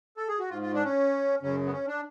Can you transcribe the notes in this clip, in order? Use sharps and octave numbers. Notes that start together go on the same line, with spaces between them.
A4
G#4
F#4
G#2 F4
F4
D4
C#4
F#2 C#3 C#4
B3
C#4
D4